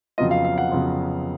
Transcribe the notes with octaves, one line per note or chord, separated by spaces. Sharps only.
F2 C#3 F#3 B3 F4 D#5
F5
F5
F#5
F2 C#3 F#3 B3 F4